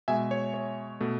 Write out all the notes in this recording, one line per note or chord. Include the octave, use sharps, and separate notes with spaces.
B2 G#3 E5 G#5
C#5
C#5
B2 A3